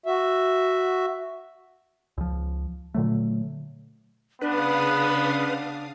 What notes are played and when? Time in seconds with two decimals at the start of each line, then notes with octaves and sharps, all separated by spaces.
0.06 F#4 E5
2.18 C#2 F3
2.94 A#2 D3 F#3 A3
4.41 C#3 B3 D4 B4 F5 D#6